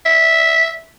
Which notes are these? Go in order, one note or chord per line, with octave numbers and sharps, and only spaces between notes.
E5